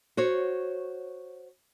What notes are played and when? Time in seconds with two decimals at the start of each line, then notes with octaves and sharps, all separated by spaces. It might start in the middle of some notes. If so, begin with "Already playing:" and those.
0.17 F#4 C5 C#5